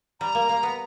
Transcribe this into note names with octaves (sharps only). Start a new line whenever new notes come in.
G3 A#5
A#3
A#3
B3